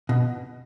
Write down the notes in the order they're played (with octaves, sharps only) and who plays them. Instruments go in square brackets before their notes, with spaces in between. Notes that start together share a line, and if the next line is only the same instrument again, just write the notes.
[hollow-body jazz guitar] B2